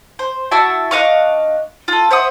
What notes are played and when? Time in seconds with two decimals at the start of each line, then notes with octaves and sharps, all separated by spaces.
0.19 C5
0.51 E4 F#4 E5 A5
0.91 D4 D#5 F5 C#6
1.88 F4 A4
2.11 C5 E5 F#5 D#6